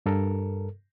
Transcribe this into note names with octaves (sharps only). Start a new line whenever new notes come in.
G2 A4 A#4